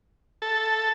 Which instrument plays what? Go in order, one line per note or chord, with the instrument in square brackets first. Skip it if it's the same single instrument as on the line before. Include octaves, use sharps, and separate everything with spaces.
[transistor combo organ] A4